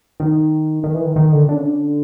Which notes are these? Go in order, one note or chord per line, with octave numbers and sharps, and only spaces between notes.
D#3
D#3
E3
D#3
D#3
D3
D3
C#3
D3